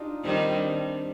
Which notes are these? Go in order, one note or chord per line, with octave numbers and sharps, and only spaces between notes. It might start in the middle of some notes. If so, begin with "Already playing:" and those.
Already playing: D4 D#4 F4 G4
D#3 G3 C4
D4